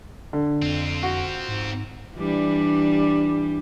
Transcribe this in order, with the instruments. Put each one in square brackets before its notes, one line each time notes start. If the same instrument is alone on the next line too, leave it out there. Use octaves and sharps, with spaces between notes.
[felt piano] D3
[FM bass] F2 [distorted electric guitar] C4 F4
[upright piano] F#4
[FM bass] G#2
[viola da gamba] E3 G3 D4